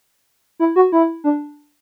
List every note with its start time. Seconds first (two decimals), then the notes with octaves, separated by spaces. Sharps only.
0.60 E4
0.76 F#4
0.92 E4
1.24 D4